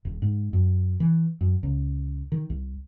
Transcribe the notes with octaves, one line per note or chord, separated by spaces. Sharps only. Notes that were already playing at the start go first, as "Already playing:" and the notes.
D#1
G#2
F#2
E3
F#2
C#2
D#3
C2